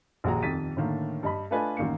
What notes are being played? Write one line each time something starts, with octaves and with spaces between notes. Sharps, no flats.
A#1 D#2 F#4 G#4 A#5
D#1 F2 D#3 A6 B6 D#7
A2 D3 D#3 A#3
G2 D#5 B5
A3 D4 F4 B4 D#5 G#5
A1 D#3 A#3 C#7